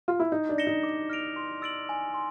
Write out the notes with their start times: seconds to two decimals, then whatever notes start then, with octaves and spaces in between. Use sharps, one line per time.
0.08 F4
0.20 E4
0.32 D#4 G6
0.49 D4
0.58 A#6 C#7 E7 G7
0.67 D#4
0.83 D6
1.10 F6 A#6 D7 F7
1.36 C6
1.62 E6 A6 D7 F#7
1.89 G#5
2.14 C6